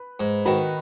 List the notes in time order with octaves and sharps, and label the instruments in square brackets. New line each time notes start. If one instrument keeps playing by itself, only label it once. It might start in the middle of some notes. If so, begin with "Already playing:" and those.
Already playing: [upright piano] B4
[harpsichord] G#2
[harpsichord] D#3 [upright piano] F#4 B4